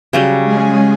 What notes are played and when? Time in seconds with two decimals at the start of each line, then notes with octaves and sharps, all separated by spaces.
0.13 C#3 F#3 G3
0.43 G#3 C#4 G#4